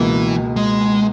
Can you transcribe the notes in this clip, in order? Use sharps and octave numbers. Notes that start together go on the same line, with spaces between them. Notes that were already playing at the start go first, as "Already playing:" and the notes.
Already playing: C#2 B2 E3 A#3
G#3